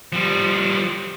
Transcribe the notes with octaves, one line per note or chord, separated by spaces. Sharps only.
F3 G3